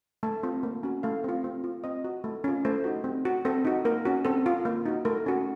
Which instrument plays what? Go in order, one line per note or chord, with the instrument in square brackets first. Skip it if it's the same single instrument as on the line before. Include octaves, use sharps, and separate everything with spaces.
[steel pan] A3 A5
C4 F4
A#3
C#4 F#4
A3 F5
C4 F4
C4
F4
C4 D#5
F#4
A3
C#4 F4
A3 C5
D#4 F#4
C4
F#4
C4 A4
D#4 F#4
A#3 A#4
C#4 F#4
C4 A4
F4
A#3
D#4 F#4
A3 A#4
C#4 F#4